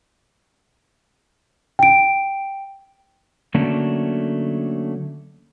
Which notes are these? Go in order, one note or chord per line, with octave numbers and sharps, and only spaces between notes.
G5 D7
D3 F#3 A3 A#3 C#4 D4